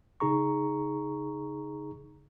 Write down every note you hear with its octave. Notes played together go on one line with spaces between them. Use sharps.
C#3 D#4 G#4 A#5 C#6